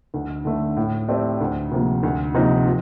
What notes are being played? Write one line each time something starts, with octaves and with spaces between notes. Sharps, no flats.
D2
D3 A3
A2
A3 C4 G4 D5
D2
C3 F3 A#3
D2
C3 F3 A#3 D#4
F3